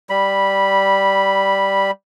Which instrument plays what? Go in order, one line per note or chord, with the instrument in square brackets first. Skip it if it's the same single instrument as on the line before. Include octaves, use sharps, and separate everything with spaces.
[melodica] G3 B5